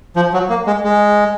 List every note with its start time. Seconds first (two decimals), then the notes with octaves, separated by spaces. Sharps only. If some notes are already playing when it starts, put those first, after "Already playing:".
0.16 F3
0.34 F#3
0.50 A#3
0.67 G#3
0.84 G#3